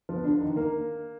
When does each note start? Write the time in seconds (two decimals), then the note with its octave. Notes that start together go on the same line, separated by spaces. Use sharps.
0.09 F3
0.16 B3
0.24 D3 D4
0.41 D#3 D#4
0.56 A#3 A#4